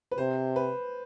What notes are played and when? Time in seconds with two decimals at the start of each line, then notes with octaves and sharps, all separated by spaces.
0.11 B4
0.18 C3 C5
0.56 B4